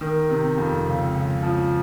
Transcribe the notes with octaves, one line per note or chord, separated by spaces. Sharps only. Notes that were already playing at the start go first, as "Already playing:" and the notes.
D#3
C3
F2
C#2
C#2
F3